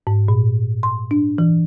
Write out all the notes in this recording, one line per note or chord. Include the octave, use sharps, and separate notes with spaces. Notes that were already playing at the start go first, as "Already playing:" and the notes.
G#2
A#2
C6
D4
E3